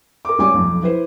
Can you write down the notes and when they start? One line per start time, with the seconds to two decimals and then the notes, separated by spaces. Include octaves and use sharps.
0.25 A#4 D6
0.38 C#2 G3 C#4 G#5 D6
0.54 B1 F2
0.83 E4 B4 C5